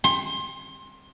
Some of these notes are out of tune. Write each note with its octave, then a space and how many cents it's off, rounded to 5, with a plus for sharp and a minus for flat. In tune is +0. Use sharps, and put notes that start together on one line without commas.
C6 +20